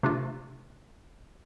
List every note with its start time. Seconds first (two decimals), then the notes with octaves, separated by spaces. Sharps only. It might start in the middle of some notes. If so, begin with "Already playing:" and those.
0.03 C3 A3 D4 F4